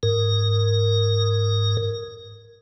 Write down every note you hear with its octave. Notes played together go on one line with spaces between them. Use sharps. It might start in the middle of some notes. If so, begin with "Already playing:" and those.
G#2 A#4